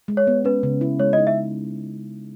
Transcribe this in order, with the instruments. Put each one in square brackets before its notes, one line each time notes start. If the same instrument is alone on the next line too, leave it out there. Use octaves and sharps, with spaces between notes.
[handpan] G#3
[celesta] C#5
[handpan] B3
[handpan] C#4 [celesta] B4
[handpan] C#3
E4
[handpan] G#3 [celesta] C#5
[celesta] D#5
[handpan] D#4
[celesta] E5